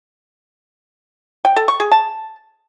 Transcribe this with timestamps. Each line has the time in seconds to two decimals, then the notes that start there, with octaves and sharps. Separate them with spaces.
1.45 G5
1.56 A4
1.68 C#6
1.80 G#4
1.91 A5